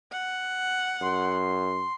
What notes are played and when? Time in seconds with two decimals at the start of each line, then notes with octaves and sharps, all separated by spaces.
0.12 F#5
1.02 F#2 C6